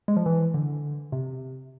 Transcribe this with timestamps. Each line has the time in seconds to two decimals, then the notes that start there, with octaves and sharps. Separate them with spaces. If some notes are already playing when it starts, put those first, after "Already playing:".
0.08 G#3
0.17 F3
0.26 E3
0.54 D3
1.12 C3